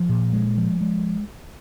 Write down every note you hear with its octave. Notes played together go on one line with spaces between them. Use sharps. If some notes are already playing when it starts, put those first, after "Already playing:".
Already playing: F3
A#2
G#3
F3
G#3